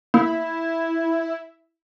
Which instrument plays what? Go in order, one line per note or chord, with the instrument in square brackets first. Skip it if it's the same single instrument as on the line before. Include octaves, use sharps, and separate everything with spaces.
[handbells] A#3 [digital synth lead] E4